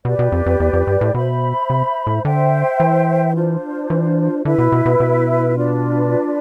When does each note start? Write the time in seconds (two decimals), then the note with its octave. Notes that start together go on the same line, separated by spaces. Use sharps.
0.05 B2 G4 B4 D5
0.19 B2
0.32 F2
0.46 F2
0.60 E2
0.73 F2
0.87 G2
1.01 A2
1.15 B2 C5 E5 B5
1.70 C3
2.07 A2
2.25 D3 C5 E5 G5
2.80 E3
3.34 D4 F4 C5
3.90 E3
4.45 D3 E4 B4 E5
4.58 B2
4.72 B2
4.86 B2
5.00 B2
5.54 D4 F4 B4 D5